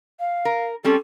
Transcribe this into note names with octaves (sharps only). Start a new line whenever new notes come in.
F5
A#4
G3 C4 C#4 A4